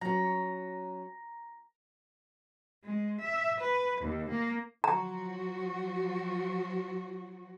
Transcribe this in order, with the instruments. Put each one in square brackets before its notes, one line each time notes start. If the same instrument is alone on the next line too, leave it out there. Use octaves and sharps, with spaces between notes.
[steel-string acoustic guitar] F#3 C#4 [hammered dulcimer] A#5
[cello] G#3
E5
B4
D#2
A#3
[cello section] F3 F#3 F#4 [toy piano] A#5